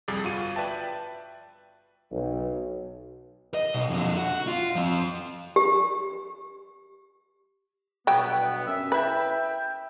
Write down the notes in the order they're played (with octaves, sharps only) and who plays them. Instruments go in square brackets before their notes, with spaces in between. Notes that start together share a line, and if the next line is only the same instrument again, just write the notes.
[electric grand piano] C2 F2 G3 G#4 D6 A6
G1 F4 F#4 D#7
B4 D5 E5 G5 A5
[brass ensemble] B1
[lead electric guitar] D#5
B1
F2 D3
F#4
F4
F3 C4
[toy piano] G4
[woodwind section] G2 B2 B3 [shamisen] F#3 G5
[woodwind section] F#2 C#4 E5
[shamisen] E4 B4 [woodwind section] E5 G5